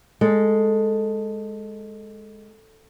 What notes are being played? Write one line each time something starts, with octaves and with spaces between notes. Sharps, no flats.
G#3 A4